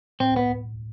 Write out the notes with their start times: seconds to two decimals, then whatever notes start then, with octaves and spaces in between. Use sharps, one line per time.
0.20 A2 C4
0.36 B3